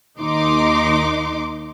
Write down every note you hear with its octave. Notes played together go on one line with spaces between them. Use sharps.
D#2 D#4 C6 D6